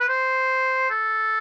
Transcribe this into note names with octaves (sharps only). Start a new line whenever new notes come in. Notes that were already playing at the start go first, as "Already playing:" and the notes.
B4
C5
A4